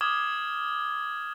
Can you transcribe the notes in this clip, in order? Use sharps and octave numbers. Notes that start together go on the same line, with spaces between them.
D6 D#6 F6 G#6 E7 G7